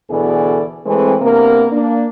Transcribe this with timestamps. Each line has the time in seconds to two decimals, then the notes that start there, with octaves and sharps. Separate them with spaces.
0.10 D2 B2 E3 G#4 A4 D5
0.86 E3 G#3 A3 C4
1.22 C3 A#3 B3 D4 A#4
1.71 A#3 D4